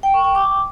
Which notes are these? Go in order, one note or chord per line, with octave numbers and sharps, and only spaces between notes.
G5
C#6
G5
D6